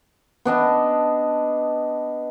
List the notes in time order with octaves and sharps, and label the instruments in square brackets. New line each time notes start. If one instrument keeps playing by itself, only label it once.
[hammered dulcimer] B3 D4 D#5 A5